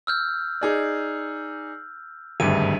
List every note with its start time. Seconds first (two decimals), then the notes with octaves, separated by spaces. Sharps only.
0.07 E6 F6 G6
0.61 D#4 G#4 D5
2.40 G#1 D2 G2 D#7